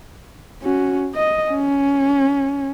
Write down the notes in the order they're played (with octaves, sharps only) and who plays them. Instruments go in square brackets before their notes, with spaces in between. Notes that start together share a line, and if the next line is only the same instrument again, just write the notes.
[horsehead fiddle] C#4 F#4
D#5
C#4